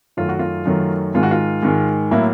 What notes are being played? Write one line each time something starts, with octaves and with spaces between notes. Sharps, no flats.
F#2 D#3 F#3 A3 F4
F#4
F4
F#2 D#3 F#3 A3
G#2 D#3 G#3 F4
F#4
F4
G#2 D#3 G#3
A2 F#3 A#3 E4